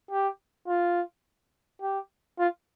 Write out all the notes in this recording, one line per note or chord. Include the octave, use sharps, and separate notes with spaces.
G4
F4
G4
F4